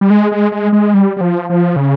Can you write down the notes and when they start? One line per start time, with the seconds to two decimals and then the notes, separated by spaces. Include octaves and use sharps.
0.01 G3
0.10 G#3
0.32 G#3
0.52 G#3
0.72 G#3
0.94 G3
1.17 G3
1.21 F3
1.50 F3
1.76 C#3